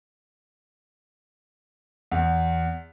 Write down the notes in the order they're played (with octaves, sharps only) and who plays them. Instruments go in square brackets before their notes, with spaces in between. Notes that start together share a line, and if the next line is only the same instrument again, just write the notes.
[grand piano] E2